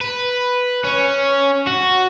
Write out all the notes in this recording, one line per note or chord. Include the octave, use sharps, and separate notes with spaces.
B4
C#4
F#4